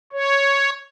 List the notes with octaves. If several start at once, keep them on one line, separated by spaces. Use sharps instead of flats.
C#5